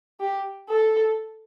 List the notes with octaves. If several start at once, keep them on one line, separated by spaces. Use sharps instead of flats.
G4
A4